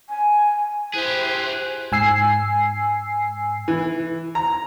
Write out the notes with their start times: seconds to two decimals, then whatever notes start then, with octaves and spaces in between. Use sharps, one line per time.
0.09 G#5
0.94 E4 G4 G#4 C5 F#6
1.92 G#2 G#5 E6 C7
3.68 E3
4.35 A#5